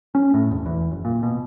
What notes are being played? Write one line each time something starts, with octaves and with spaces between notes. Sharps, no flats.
C#4
A2
E1
E2
F#1
A#2
B2